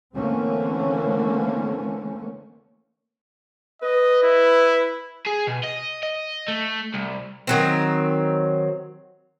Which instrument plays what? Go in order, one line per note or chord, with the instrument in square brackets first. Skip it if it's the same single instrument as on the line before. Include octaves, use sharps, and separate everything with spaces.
[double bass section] D3 E3 A3 A#3 C4 C#4
[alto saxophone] B4 [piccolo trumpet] D#5
[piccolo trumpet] E4
[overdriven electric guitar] G#4
B2
D#5
D#5
A3
C2
[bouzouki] D#3 F#3 C4